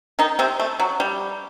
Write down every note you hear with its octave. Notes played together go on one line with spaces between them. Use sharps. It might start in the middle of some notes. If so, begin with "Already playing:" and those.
D#3 D#4
C3 C4
A3
F#3
G3